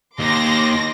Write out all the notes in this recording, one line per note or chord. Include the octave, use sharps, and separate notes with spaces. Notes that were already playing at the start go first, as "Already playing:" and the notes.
D#2 C6 D6 A#6